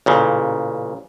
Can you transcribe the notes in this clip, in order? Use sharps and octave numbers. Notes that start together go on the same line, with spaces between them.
A1 A#2 C#3